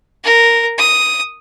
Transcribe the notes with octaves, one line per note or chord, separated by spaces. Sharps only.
A#4
D#6